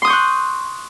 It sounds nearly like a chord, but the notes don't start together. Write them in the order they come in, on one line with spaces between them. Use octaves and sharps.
C6 D#6 G6 C#6 F#6